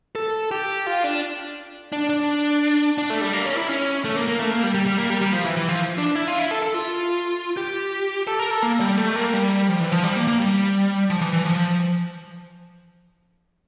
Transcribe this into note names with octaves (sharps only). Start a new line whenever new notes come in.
A4
G4
F4
D4
D4
D4
D4
A3
G3
A#3
C#4
E4
C#4
A3
A#3
A#3
A3
A#3
G3
G3
G3
A#3
G3
G3
F3
E3
E3
F3
D4
E4
F4
E4
A4
A4
F4
G4
A4
A#4
A4
A#3
G3
A3
A#3
G3
F3
E3
F3
G3
A#3
A#3
G3
F3
E3
E3
F3